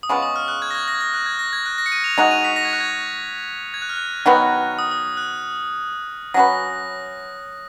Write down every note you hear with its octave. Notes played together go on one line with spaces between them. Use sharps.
D#6
C#3 G#3 B3 F4 C#6
D#6
F6
F#6
G#6
A#6
G#6
A#6
G#6
A#6
F#6
G#6
A#6
G#6
F#6
A#6
C#7
D#7
F7
G#3 D#4 F#4 F7
D#7
B6
A#6
G#6
F#6
G#6
G#6
F#6
F6
F#6
D#3 F#3 B3 F#4
D#6
D#6
F#6
F#3 C#4 F#4 B4 A#6